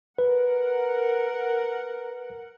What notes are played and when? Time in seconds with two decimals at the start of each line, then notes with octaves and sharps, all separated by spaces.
0.18 A#4 B4 F#5